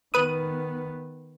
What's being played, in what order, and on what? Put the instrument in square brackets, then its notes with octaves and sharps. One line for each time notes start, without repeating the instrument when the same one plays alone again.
[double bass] D#3 B3 [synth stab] B4 D#6